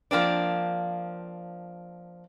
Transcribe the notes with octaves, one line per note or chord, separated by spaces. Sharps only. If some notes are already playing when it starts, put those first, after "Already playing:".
F3 A#3 C4 D4